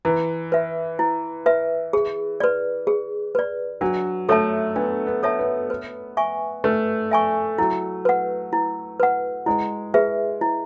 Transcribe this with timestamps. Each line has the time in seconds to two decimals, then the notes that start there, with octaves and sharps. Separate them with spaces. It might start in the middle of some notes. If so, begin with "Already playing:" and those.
0.05 E3 E4
0.52 B4 E5
0.99 E4
1.46 B4 E5
1.93 G#4
2.40 B4 D5
2.87 G#4
3.35 B4 D5
3.81 F#3 D4
4.29 A3 A4 C#5 E5 A5
4.76 B3 D4
5.07 B3
5.23 A4 C#5 E5 A5
5.39 B3
5.70 B4
6.17 E5 G#5 C#6
6.64 A3 B4
7.11 E5 G#5 C#6
7.58 F#3 E4
8.05 B4 F#5
8.53 E4
9.00 B4 F#5
9.46 G#3 E4
9.94 G#4 B4 E5
10.41 E4